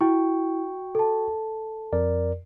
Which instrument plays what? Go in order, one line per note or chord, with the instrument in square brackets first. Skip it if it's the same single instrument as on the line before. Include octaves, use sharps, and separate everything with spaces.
[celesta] E4 [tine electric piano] F#4 G5 C#6
[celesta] A4 A5
[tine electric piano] F2 A#4 D5